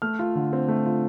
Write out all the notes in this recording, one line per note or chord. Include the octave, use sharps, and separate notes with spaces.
A3 F6
F4
D3
C4
A3
F4